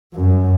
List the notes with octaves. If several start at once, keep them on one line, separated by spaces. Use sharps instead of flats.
F#2